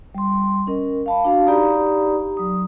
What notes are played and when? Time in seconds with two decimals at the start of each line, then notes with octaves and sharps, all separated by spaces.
0.15 G3 C6
0.67 C#4 A#4 D#5
1.06 F5 A5 B5
1.24 D4 F#4 F5
1.46 D#4 G4 D5 A#5 B5 D#6
2.37 F#3 D#6